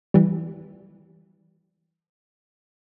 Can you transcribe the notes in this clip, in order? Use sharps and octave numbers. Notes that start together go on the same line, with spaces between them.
E3 G3